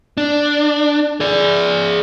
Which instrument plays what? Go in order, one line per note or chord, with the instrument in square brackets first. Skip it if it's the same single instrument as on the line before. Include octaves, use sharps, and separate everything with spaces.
[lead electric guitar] D4
G#4 D5